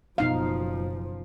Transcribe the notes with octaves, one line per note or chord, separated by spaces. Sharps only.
F#1 B2 F3 D#4 F5